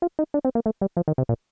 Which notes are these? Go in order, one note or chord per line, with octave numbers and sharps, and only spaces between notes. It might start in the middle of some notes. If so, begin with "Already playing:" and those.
F4
D#4
D4
C4
A#3
A3
G3
F3
D#3
C3
A#2